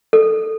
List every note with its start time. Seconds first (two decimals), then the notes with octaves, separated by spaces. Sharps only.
0.13 A4